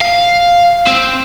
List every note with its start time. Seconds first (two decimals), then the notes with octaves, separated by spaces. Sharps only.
0.01 F5
0.87 C4